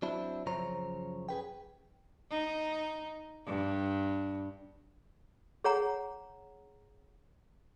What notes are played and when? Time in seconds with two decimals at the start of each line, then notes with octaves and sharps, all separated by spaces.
0.02 F#3 C4 D4 E4
0.46 F#2 C#3 F3 C5 C#5 A#5
1.29 G#4 B4 G5
2.31 D#4
3.46 G2
5.64 G#4 C#5 F#5 A#5